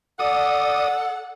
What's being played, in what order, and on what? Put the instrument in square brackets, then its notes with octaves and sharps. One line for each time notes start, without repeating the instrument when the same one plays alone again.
[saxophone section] A4 F#5 [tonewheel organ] D5 D#6